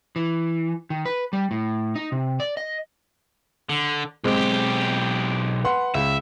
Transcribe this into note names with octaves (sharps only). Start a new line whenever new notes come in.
E3
D#3
B4
G3
A2
D#4
C3
D5
D#5
D3
B1 G#3 C4 G4
B4 F#5 C6
C#2 E5